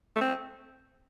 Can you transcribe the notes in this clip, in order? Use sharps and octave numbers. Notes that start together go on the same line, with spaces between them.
A3
C4